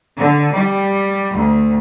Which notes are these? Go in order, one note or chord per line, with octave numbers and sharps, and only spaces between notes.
D3
G3
D2